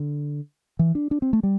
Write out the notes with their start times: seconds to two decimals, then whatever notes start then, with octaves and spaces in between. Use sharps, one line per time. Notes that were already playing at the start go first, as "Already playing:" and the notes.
Already playing: D3
0.79 E3
0.95 D4
1.11 D4
1.22 C4
1.33 A3
1.43 G3